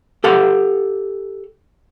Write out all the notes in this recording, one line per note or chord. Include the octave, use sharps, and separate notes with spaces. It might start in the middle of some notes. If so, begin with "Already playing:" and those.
G4 A4 F5 F#5